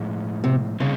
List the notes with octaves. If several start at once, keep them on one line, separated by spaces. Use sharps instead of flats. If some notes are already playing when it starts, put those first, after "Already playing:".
Already playing: A2 F3 G#3
C3
C#3 G3 C4 D#4 G#4